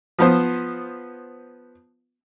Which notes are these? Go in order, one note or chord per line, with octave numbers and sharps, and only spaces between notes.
F3 B3 C5